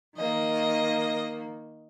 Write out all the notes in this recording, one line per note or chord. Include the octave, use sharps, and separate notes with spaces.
D#3 A#3 D#5